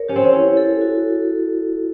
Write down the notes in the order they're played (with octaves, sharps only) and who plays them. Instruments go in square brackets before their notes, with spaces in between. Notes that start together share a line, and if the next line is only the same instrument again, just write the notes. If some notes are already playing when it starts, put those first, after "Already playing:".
Already playing: [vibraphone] A#4 C#5
[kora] C#4 [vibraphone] G4
[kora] C4
C#4
[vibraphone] E4
A4
F#4